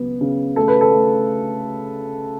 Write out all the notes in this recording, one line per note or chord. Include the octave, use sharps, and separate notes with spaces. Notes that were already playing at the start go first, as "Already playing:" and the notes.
Already playing: C#2 F#3 B3
C#3
A3 A4
B4
A4
A3